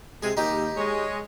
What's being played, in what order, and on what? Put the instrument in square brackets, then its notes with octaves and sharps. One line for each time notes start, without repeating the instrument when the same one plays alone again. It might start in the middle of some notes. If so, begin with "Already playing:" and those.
[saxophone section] C3 G#3 [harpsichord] G#4
[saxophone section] D#2 [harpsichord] D#4 G4
[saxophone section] G#3 C#5